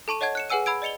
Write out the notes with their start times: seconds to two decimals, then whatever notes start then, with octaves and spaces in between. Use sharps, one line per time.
0.08 A4 A5 C#6 D#7
0.21 C#5 D#5 F#5 A5 G#6
0.35 F#6 C#7 E7
0.50 G#4 B4 F#5 G#5 E6 D#7
0.66 F#5 B5 E6 G#6 D7
0.82 D5 D#5 C#7 F7 G7